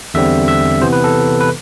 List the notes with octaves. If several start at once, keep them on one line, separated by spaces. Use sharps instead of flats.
E2 D3 G3 C4 E5
E5
C3 E3 B3 C5
B4
A4
B4